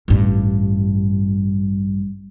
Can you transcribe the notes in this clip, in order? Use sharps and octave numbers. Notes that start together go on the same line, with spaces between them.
A1 G2